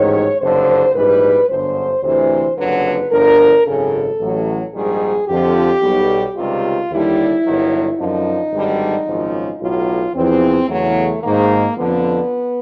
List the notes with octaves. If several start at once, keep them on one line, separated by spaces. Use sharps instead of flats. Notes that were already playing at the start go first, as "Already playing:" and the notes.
Already playing: A1 G#2 D#3 F#3 C#5
F#1 F2 D3 C5
A#1 G#2 E3 G3 B4
G1 F#2 D3 C5
D2 C3 E3 C5
F#1 F2 D3 F#3 B4
G1 G2 D3 F3 A#4
G#1 F#2 C#3 A4
A1 A2 F#3
A#1 G#2 D#3 G3 G#4
F2 D3 F3 G4
B1 B2 G3
C#2 C3 D#3 G3 F4
D#2 D3 G3 E4
G1 G2 D#3 F#3
F#2 D3 F3 D#4
G#1 G2 D3 G3
G#1 F#2 C#3 F3
B1 A2 F#3 F4
E2 C3 F3 C4
E2 C#3 F#3 A3
G#1 G#2 D#3 A#3
F2 D3 F3 B3